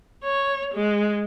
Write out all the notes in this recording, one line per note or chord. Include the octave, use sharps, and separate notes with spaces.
C#5
G#3